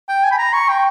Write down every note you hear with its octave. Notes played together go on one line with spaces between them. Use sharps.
G5
G#5
B5
A#5
C#6
G5